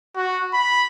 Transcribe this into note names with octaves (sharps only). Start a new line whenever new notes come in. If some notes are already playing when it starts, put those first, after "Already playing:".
F#4
B5